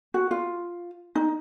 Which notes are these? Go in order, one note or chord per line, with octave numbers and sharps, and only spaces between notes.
F#4
F4
D#4